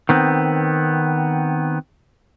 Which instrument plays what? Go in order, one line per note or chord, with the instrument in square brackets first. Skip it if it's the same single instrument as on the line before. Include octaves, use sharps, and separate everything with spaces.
[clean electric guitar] D#3 B3 C4